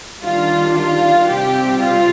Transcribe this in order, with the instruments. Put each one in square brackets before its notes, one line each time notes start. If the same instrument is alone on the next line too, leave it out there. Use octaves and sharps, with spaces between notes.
[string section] D#3 G3 D4 F4
F4
C3 G3 C4 G4
F4